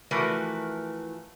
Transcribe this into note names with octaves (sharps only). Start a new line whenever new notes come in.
E3 F3 A3 F#4 A#4 B4